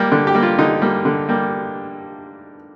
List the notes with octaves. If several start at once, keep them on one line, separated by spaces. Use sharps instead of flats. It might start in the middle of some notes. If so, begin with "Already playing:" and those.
Already playing: G3 A#3
D3
G4
G3 A#3
F4
D3 D#4
G3 A#3
D3
G3 A#3